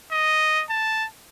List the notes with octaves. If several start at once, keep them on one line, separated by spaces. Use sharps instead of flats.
D#5
A5